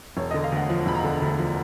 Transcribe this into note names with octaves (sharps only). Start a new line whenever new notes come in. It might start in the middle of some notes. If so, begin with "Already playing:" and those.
E1 C#5
D3 D#5
F5
D2 F#5
F3
E1 B5
A#5
D3
D2
F3